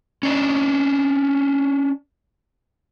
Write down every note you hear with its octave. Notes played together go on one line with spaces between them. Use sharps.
C#4 D4 D#5